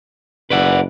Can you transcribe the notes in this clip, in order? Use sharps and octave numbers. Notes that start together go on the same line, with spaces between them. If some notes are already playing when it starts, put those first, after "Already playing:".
F#1 B4 D5 F#5